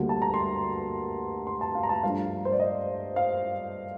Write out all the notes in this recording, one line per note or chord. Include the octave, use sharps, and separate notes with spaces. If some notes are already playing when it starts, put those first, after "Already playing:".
Already playing: D2 D3 G3 A#3
A5
A#5
C6
C6
A5
F5
A#5
A5
G2 F3 A3 D4 F5
C5
D5
D#5
F5